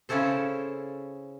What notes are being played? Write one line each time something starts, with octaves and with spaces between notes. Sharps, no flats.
C#3 C#4 E4 A4 C5